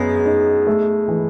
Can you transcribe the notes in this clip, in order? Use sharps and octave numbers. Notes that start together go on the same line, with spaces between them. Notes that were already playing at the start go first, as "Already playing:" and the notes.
Already playing: F#2 G#3 B3
D#4
A3
E3